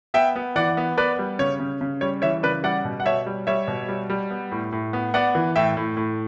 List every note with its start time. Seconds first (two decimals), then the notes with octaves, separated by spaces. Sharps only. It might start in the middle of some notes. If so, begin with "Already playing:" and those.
0.14 B3 E5 G5
0.36 B3
0.56 E3 D5 F#5
0.77 B3
0.98 B3 B4 D5
1.19 G3
1.39 C#3 C#5
1.60 C#3
1.81 C#3
2.01 G3 C#5
2.22 E3 C#5 E5
2.43 C#3 B4 D5
2.64 G3 D5 F#5
2.85 B2
3.00 F#5
3.06 B2 C#5 E5
3.26 G3
3.47 G3 C#5 E5
3.68 B2
3.88 G3
4.10 G3
4.31 B3
4.52 A2
4.72 A2
4.93 B3
5.14 B3 D5 F#5
5.35 E3
5.56 A2 E5 G5
5.77 A2
5.97 A2